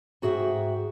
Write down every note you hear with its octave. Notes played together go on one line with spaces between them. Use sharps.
G#2 F#4 G#4 E5 G5